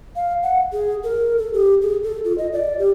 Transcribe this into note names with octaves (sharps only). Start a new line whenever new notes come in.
F5
F#5
G#4
A#4
A4
G4
G#4
A4
F4
D#5
D5
G4